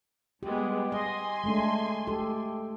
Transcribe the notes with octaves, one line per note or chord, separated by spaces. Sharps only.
G3 G#3 B3 G4
D#5 G#5 C6
G#3 A3 D4
A3 G4 A4